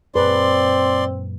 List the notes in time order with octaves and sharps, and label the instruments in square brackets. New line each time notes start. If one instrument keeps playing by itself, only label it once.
[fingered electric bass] F#2 A#2 [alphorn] C4 [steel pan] G#4 B4 [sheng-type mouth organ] D5 C6